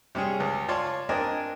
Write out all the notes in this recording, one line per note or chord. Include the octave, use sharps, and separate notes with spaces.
C3 G3 C#4 G#4
C#2
F4 C#5 D5 A5 C6 D6
C4 D4 A#4 D#5 G#5